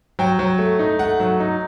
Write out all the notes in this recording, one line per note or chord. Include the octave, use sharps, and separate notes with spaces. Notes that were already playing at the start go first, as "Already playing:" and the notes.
F#3 G5
F#3
A3
D#4
A3 F#5
F#3
D#4